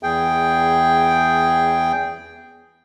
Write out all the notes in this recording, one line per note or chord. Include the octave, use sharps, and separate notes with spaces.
E2 G#4 G5